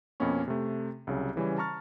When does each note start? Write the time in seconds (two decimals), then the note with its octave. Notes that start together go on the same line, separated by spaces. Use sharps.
0.20 F2 B2 A#3 B3 C#4 C#6
0.48 C3 A3
1.07 C2 C#3 F#3
1.36 C#3 E3 G3 C#4
1.58 A5 A#5 C#6 F6 A6